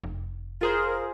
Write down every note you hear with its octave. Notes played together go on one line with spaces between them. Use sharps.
F1
F4 G#4 A#4 C5